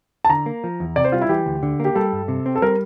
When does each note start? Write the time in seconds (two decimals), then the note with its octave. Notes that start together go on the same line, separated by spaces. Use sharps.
0.25 A5
0.29 D3 A#5
0.46 A#3
0.64 F3
0.80 E2
0.96 C3 D5
1.04 C5
1.12 G3 F4
1.21 E4
1.29 E3 G4
1.46 D2
1.63 D3
1.80 A#3 G4
1.95 G3 A4
2.13 G2
2.28 C3
2.46 C4
2.55 A4
2.62 G3 A#4